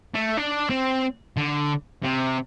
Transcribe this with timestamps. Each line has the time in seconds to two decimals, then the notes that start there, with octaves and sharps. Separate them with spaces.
0.15 A3
0.37 D4
0.70 C4
1.37 D3
2.04 C3